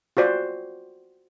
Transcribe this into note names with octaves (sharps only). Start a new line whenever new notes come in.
F4 F#4 C5 D5